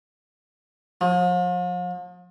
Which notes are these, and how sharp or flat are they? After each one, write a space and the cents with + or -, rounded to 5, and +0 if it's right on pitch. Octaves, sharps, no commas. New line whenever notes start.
F3 +40